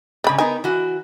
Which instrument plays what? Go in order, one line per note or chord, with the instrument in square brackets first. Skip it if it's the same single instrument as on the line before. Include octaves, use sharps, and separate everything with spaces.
[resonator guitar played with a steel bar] G#2 C#3 [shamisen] D5 B5
[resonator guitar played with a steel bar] B3 D#4 A#4 [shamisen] G#5
[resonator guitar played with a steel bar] E3 F#4